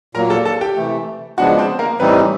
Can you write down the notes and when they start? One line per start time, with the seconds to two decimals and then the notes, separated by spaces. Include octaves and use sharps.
0.15 A#2 F#3 A#3 A#4 A#5
0.30 A4 A5
0.45 A4 A5
0.61 G4 G5
0.76 C3 E3 A3
1.38 C#3 F3 G#3 B3 D4 F#4 F#5
1.58 C4 C5
1.79 A#3 A#4
2.00 A2 E3 G3 B3 C4 D#4 B4